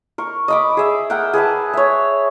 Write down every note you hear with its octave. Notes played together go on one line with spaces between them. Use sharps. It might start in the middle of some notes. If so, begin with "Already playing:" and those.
A#4 C#6
D#5 B5 D6
G#4 E5
A#4 F#5 G5
G#4 B4 E5 A5
C#5 E5